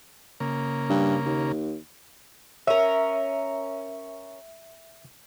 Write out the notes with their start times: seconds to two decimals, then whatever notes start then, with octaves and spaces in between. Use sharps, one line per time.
0.40 C#3 A#3
0.90 G2
1.26 D#2
2.67 C#4 A#4 E5